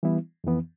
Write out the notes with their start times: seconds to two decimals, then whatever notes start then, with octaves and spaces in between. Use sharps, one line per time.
0.03 E3 G3 B3 E4
0.44 F2 E3 B3